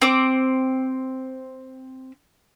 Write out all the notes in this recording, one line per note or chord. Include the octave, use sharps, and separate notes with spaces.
C4 D6